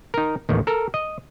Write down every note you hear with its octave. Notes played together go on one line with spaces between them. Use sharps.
D#4 A#4
A1 D#2 D#3
A4 A#4
D#5